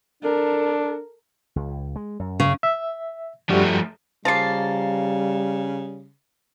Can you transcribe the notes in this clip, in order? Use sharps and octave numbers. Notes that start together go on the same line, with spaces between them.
D4 A4 A#4
C#2
G#3
F#2
C#3
E5
G2 F3 G3 A3 F#4
C#3 F3 G3 A#3 A6 C7